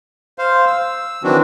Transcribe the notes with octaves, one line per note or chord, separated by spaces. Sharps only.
C5 F5
E6
D#3 E3 F#3 C4 D4 F#4